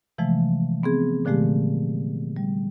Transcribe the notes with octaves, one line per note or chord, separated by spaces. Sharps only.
C3 E3 F3 G#3 A3
B3 C4 G#4
A#2 D3 F3 G#3 A3 G4
G3